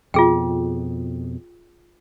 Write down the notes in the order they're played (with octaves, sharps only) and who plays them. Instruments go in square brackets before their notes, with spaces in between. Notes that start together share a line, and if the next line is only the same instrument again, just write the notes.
[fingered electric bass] F2 B2 [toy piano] F4 G#4 G5